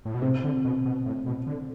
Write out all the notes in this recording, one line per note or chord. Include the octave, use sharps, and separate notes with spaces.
A2
B2
C3 C4
D3
B2
B2
A2
B2
D3